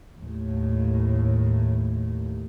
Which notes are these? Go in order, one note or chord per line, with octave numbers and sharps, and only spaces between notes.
D#2 A2